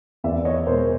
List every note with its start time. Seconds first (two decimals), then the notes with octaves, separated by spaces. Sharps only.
0.24 E2 D5 E5
0.45 C#5 D#5
0.66 B2 G#3 A#4 C5